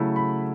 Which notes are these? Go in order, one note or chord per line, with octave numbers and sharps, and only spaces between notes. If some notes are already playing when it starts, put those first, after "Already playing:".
Already playing: C#3 F#3 A3 E4
B5